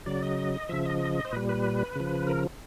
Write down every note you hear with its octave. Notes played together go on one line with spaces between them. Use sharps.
C#3 F#3 D5
D#5
C#3 F3 E5
D#5
C5
A#2 G3 B4
B4
C#3 F3
A#4